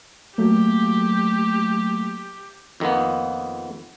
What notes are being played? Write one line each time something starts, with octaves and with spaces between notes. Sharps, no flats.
F#3 A3 A#3 G4
F2 D#3 F3 A#3 B3